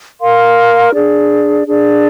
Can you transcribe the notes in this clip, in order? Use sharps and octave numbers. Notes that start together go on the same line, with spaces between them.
A#4 F5 C6
D4 G#4 D5
D4 G#4 D5